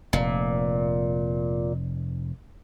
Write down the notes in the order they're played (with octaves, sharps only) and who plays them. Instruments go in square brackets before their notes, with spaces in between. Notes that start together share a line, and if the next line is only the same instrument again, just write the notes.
[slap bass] F1 [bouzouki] A#2